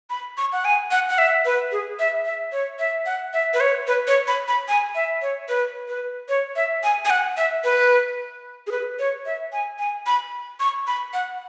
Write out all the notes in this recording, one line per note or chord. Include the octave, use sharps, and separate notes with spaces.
B5
C#6
F#5
G#5
F#5
F#5
E5
B4
G#4
E5
E5
C#5
E5
F#5
E5
B4
C#5
B4
C#5
B5
B5
G#5
E5
C#5
B4
B4
C#5
E5
G#5
G#5
F#5
E5
B4
G#4
B4
C#5
E5
G#5
G#5
B5
C#6
B5
F#5